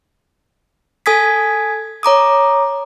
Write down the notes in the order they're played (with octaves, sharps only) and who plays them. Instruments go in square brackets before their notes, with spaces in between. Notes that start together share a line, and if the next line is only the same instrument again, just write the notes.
[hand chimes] A4 G#5 D#6 G#6 B6
C#5 A#5 D6 D#6